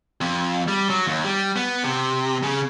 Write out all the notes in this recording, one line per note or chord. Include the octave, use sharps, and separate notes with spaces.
F2
G3
F#3
D#2
G3
B3
C3
C#3